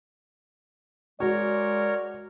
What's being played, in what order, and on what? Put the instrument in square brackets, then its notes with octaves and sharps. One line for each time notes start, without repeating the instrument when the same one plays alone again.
[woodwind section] G#3 [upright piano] F#4 [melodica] A#4 C#5 [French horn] D5